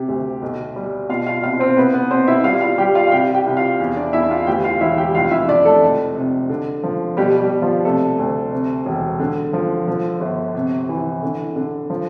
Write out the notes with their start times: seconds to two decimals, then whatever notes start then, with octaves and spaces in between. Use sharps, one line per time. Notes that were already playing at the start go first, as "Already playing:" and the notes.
Already playing: C3 G4
0.08 D2
0.42 B1
0.76 G3
1.09 B2 F4 F5
1.27 F4 F5
1.43 C2 F4 F5
1.59 C4 C5
1.77 C2 B3 B4
1.93 B3 B4
2.11 B2 C4 C5
2.27 E4 E5
2.44 G3 F4 F5
2.61 F4 F5
2.78 G3 G4 G5
2.95 F4 F5
3.08 F5
3.11 C2 G4 G5
3.34 G4 G5
3.46 C2
3.57 F4 F5
3.80 E2
3.96 D4 D5
4.13 E2 E4 E5
4.31 F4 F5
4.47 D2 G4 G5
4.64 F4 F5
4.81 E1 E4 E5
4.98 G4 G5
5.15 F1 F4 F5
5.31 E4 E5
5.48 F1 D4 D5
5.65 A3 A4
5.82 F1
6.16 C3
6.49 D3
6.84 F3
7.17 B2 G3 G4
7.39 G3 G4
7.51 G3
7.62 F3 F4
7.85 C3 A3 A4
8.19 D2
8.52 C3
8.86 E1
9.19 D3
9.53 F3
9.88 F3
10.21 G1
10.55 C3
10.89 E3
11.23 D3
11.56 D3
11.90 F3